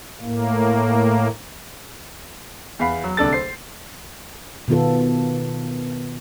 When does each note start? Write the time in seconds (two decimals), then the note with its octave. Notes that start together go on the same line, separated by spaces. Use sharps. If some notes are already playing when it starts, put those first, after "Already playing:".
0.21 A2 A#3
2.79 E2 F5 B5 C7
3.04 F#3
3.17 D1 C2 D4 A4 A6
3.33 C5 C7
4.68 B2 D#3 B3 F4 A4